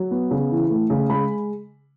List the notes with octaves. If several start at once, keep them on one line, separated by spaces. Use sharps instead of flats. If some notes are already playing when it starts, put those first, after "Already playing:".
Already playing: F#3
B3
C#3
E3
A3
C#3
G#3 B5